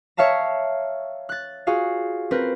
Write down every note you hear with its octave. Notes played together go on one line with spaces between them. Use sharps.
C#5 E5 F5 A5 A#5
F#6 A6
F4 F#4 G#4 F5
C4 A#4 B4